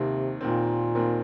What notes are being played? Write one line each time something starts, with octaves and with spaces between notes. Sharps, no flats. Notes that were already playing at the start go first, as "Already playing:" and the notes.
Already playing: D#2 C3 D#3 C4
D#2 A#2 D#3 C4
D#2 D#3 C4